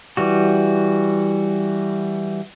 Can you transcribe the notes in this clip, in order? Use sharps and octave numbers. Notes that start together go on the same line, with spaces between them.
E3 G3 F#4